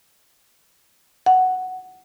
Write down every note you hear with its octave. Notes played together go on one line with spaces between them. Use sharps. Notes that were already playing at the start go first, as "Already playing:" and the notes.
F#5